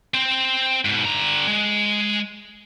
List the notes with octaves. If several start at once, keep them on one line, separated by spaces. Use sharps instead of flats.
C4 C5
G#2 B2
D3 A#5
G#3